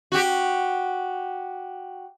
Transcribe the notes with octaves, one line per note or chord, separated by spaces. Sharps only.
F#4 G4